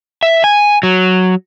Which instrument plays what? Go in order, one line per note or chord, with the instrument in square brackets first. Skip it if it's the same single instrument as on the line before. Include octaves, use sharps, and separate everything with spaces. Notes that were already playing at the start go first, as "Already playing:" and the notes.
[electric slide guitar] E5
G#5
F#3